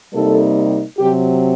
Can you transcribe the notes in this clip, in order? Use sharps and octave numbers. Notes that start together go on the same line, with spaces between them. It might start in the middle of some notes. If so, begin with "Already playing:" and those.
C3 G3 A#3 D#4 A4
C3 F#3 C4 G4